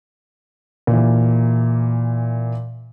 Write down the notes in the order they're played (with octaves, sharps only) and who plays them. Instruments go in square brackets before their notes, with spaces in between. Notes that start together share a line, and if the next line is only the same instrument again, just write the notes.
[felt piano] A#2 E3